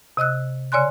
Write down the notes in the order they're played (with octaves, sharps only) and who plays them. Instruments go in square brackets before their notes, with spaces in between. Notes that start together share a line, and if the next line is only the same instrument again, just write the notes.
[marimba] C3 D#5 E6 F#6
C#3 C#5 D5 G#5 C6 F#6